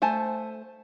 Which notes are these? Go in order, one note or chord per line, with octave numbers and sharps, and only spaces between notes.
A3 C5 G#5 A5